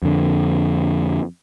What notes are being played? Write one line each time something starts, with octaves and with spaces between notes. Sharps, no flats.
F2 D3